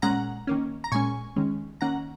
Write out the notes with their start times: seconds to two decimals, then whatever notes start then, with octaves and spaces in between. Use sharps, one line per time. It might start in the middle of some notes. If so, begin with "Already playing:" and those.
0.02 A#2 G#3 C#4 F#5 A#5
0.47 D#3 A#3 C#4
0.84 A#5
0.92 A#2 G#3 C#4 G#5 C#6
1.36 D#3 G#3 C#4
1.81 D#3 A#3 C#4 F#5 A#5